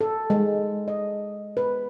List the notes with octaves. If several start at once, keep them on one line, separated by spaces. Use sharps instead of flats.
A4
G#3
D#5
B4